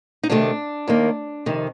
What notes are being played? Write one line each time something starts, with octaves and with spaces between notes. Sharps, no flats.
D#4
D2 C3 D#3 A3 D4
D#2 D#3 A#3
F2 C3 D#3